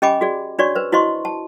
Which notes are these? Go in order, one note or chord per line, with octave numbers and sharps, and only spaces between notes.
C#4 G4 D#5 G#5 B5 D6
F#4 G#4 D5
D4 F#4 C#5 D5 C#6
B4 C5
E4 F#4 C5 D#5 C6 C#6
A5